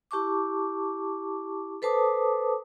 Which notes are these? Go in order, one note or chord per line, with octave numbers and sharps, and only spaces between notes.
E4 G4 A5 C#6 D6
A4 B4 C5 A5 D6 D#6